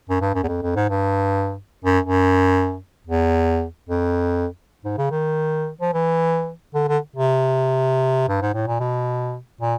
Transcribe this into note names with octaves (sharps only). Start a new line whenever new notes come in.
F#2
G2
F#2
E2
F2
F2
G#2
G2
F#2
F#2
E2
F2
G#2
C#3
D#3
F3
E3
D3
D3
C3
G2
G#2
A2
A#2
B2
A#2